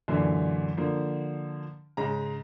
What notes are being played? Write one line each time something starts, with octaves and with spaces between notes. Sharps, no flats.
F#2 A#2 D3 E3
D3 F3 A#3
G#2 C#3 A#5